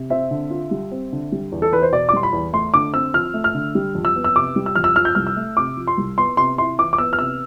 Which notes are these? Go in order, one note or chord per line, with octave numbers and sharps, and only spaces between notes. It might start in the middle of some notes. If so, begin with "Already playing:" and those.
Already playing: C3
C4 E5
D3
F4
G3
C4
D3
G3
E2
A4
E2 B4
C5
B2 D5
D6
G3 C6
B5
E2
A3 C6
D3 D6
C4 E6
F3 F6
A3
F6
D3
G3
F2
E6
B3
E6
C3 D6
G3
E6
F2 F6
E6
F3 F6
G6
C2 F6
E6
A3
C3 D6
F3
C6
C2
B3 C6
C3 C6
E4 C6
E3 D6
D6
B3 E6
F6
C3 E6